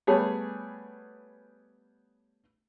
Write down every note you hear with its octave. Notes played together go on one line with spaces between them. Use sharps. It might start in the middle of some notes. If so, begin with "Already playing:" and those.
G3 A3 B3 G#4 C#5